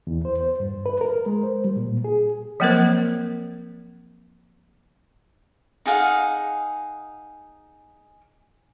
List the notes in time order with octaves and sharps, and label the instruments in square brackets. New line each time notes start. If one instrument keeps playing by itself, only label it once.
[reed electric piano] E2
C5
C5
G2
B4
A#4
G#3
C5
G3
A#2
G#4
[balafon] F3 F#3 A#3 C4 A#4 C5
[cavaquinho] D#4 G#4 F5 F#5